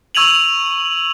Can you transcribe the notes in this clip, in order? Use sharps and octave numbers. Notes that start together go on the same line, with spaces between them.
C#6 E6 G#6 D#7 F7 F#7